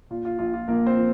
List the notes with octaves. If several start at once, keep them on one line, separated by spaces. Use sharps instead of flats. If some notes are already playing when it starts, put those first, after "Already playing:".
A#2 F4
F4
A#1 F4
F4
A#1 A#3 A#4
C4 C5
F3